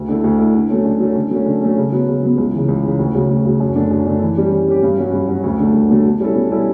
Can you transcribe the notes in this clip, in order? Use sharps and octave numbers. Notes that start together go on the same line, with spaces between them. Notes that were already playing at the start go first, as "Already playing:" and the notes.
Already playing: D2
D3 A3 E4
D2
D3 A3 E4
D3
F#3 A3 C#4
D3
F#3 A3 C#4
D3
F#3 A3 C#4
D3
F#3 A3 C#4
C#3
F#3 B3
C#3
F#3 B3
C#2
C#3 E3
C#2
C#3 E3
D2
C#3 F#3
D2
C#3 F#3
F#2
D3 A3 D4
F#2
D3 A3 D4
E3
G3 C#4 G4
E3
G3 C#4 G4
G2
F#3 C#4 F#4
G2
F#3 C#4 F#4
D2
D3 F#3 A3
D2
D3 F#3 A3
B2
G3 C#4 E4 A4
B2
G3 C#4 E4 A4